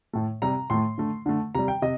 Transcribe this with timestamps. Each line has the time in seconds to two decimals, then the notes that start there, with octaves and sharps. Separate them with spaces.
0.13 A2 A3
0.42 C3 G3 A#5
0.70 A2 A3 C6
0.98 D3 A3
1.26 D3 A3
1.55 C3 G3 A#5
1.68 G5
1.82 C3 D#5